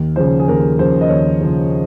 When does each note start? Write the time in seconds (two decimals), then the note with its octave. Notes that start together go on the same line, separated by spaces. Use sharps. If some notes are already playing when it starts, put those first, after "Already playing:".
Already playing: D#2
0.16 C#3 F3 C5
0.39 G#4
0.48 D#2 A#4
0.79 C#3 F3 C5
1.01 D#5
1.09 D#2 C#5
1.41 C#3 F3